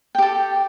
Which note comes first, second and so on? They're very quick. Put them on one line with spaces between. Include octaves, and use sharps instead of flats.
G5 G4 A4